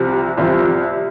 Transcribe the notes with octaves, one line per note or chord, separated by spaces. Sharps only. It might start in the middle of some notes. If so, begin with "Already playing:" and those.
Already playing: C2 C3 F3
C2 C3 F3